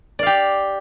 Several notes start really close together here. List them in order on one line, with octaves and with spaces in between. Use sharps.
D5 F5 G4